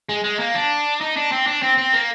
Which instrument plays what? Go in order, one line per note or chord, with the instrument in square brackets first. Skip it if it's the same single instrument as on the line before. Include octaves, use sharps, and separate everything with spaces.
[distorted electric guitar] G#3
G#3
A#3
D4
D#4
D4
C4
D4
C4
C4
A#3